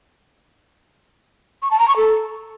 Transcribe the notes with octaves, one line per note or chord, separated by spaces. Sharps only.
C#6
A5
A#5
C#6
A4